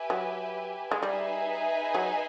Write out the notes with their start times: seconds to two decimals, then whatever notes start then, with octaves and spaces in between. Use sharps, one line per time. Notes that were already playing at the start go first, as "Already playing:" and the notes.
Already playing: G4 B4 E5 G#5
0.10 F#3
0.91 G#3
1.02 G3 D#4 G#4 B4 E5 G#5
1.94 F#3